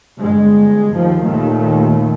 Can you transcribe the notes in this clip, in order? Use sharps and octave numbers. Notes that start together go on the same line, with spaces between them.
G1 G#3
D#2 F3
D#2 A#2 D#3 A3